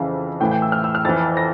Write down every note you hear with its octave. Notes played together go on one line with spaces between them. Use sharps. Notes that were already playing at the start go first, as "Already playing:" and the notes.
Already playing: F2 C#3 E3 F5
A2 E3 G5
G5
E6
F6
E6
F6
F2 E3 A6
A#6